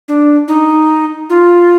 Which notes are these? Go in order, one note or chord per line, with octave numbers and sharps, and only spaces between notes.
D4
D#4
F4